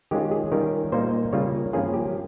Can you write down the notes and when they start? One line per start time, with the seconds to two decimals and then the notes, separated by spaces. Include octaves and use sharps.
0.11 D#3 G#3 C#4 F4 G4
0.31 G#4
0.52 D#3 G3 C#4 F4 A#4
0.92 A#2 G3 A#3 D#4 C5
1.33 C#3 G3 A#3 F4 C#5
1.73 G2 F3 A#3 C#4 F4 G#4
1.94 G4